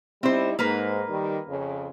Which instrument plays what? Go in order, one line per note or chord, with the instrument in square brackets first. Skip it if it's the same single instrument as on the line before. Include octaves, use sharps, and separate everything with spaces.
[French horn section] G3 D#4 E4 [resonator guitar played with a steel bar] C4 C5
[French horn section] G#2 [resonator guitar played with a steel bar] A#3 A#4 B4
[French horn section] D#3 G3
F2 C#3